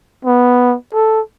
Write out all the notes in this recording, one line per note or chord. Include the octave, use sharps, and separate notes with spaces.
B3
A4